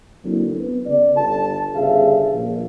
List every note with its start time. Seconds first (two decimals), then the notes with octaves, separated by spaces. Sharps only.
0.25 F#2 D3 F#3 A#3 C4 E4
0.57 B3
0.86 C#3 D5
1.16 G1 F4 A4 A5
1.75 G1 C#3 G#4 E5 F5
2.33 A#1